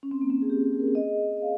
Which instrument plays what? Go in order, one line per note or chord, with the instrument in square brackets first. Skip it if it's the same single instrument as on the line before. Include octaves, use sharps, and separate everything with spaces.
[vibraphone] C#4
C4
A#3
C4
G#4
G4
G#4
A#4
G#4
D#5
D#5
F5